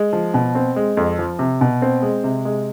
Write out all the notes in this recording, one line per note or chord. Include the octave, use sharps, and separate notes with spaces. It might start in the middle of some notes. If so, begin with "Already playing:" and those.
Already playing: G#3
F3
B2
C4
G#3
F2
F3
C3
B2
C4
G#3
C3
G#3